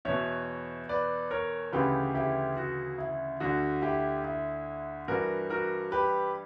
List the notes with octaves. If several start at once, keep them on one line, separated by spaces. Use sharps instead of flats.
E2 B2 C#5 E5
B4 D5
A#4 C#5
D2 C#3 E3 G4 B4
E4 G4
F#4
E4
D2 D3 F#4
E4 G4
E4
G2 E3 F#4 A#4
F#4 A#4
G4 B4